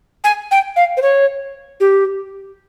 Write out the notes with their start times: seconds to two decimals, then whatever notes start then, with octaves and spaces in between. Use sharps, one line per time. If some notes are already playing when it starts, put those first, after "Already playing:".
0.24 G#5
0.51 G5
0.76 F5
0.97 C5
1.02 C#5
1.80 G4